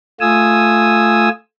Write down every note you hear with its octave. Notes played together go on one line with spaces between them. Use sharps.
A3 F4 G#5 D#6 E6